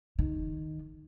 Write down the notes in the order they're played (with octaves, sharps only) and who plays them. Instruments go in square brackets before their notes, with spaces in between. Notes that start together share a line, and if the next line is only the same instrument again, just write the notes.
[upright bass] D#3